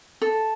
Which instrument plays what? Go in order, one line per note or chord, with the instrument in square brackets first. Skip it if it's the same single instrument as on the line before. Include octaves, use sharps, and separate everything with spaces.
[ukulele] A4